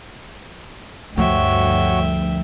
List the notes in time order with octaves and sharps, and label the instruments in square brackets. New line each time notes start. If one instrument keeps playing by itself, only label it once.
[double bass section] D2 G2 [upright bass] F3 A3 [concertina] F#4 C#5 [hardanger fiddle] E5 G5